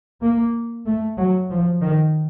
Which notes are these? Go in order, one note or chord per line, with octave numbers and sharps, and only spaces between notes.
A#3
A3
F#3
F3
D#3